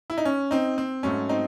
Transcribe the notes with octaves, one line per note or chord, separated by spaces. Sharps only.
E4
D#4
C#4
C4 D#4
C4
G#2 F#3 A3 C#4
C4 D#4